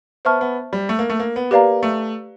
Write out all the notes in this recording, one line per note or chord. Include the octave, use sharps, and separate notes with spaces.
B3 C5 E5 A5 C#6 F6
B3
G3
A3
A#3
A3
A#3
B3
A#3 G4 B4 D5 F5 A#5
A3